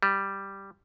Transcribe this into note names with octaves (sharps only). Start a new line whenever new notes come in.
G3